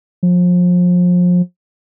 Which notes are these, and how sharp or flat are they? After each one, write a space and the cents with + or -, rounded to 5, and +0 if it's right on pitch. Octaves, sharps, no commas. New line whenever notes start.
F3 +30